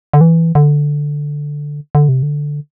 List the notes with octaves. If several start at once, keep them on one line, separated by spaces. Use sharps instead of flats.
D3
E3
D3
D3
C3
D3